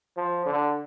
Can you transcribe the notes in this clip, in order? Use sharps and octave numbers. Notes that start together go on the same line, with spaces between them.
F3
D3